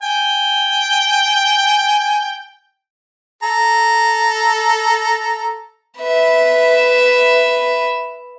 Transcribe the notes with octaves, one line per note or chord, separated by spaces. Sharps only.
G5 G#5
A4 A#5
B4 E5